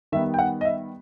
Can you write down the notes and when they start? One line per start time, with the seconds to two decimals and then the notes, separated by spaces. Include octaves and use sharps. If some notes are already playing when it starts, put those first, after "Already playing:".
0.12 D#3 G3 B3 E5
0.34 G5
0.39 F#5
0.61 D#5
0.65 E5